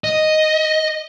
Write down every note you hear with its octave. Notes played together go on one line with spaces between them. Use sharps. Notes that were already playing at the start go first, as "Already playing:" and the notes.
D#5